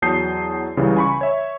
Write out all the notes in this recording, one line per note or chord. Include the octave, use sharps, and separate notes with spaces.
E2 F#3 A5 D#6 G6 C7
C#2 C#3 E3 G3
G#5 B5 C#6
C#5 E5